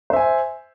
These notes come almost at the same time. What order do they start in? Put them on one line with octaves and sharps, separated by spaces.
C5 E5 G#5